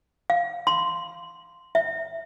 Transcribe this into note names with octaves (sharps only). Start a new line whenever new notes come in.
F5
C6
E5